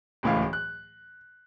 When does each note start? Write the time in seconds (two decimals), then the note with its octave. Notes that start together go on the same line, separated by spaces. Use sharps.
0.23 D1 C#2 A2 E3 F5
0.53 F#6